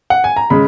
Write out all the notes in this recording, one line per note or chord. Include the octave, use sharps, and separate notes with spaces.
F#5
G#5
A#5
C#3 G#3 B5